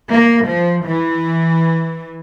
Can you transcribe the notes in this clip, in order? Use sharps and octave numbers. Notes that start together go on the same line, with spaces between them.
A#3
F3
E3